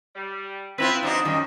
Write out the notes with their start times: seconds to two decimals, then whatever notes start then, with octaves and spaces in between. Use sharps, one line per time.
0.15 G3
0.78 C4 E4 F4 B4
1.03 F3 D4 D#4 F#4
1.25 F#2 D#3 G3